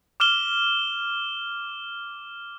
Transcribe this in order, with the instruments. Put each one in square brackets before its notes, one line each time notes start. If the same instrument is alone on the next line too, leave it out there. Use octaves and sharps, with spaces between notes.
[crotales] D6 F6 E7 G7